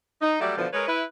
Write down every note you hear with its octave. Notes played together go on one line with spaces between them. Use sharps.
D#4
F#3 G3 A3 G4 D5 E5
B2 D3 E3 F3
G#3 A#4 B4 C#5
E4 B4